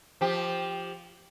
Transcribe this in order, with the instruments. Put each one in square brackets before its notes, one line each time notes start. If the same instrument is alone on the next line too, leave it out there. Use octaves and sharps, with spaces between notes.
[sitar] F3 G4